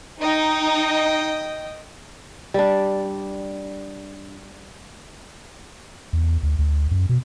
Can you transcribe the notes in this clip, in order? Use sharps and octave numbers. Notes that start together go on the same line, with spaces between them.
D#4 D#5 G5
G3 D4
E2
D2
D2
F#2
B2